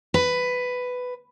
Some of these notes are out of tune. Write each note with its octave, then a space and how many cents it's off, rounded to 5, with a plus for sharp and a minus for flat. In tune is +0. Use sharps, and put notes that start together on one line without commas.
B4 +10